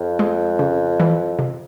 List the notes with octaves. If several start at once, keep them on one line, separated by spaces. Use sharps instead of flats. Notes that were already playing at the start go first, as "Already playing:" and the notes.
Already playing: F2
G#3
C#3
E3
C3